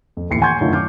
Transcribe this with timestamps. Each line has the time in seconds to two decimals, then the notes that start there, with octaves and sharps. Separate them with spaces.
0.17 F2
0.30 D1 D#2 E3 C7 C#7
0.41 F#5 G#5 C6 C#6 G6 G#6
0.61 F#2 D3 D#3 A3 E4 F4
0.73 D6 F6 G6